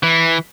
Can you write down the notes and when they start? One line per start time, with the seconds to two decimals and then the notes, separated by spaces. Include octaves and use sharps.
0.03 E3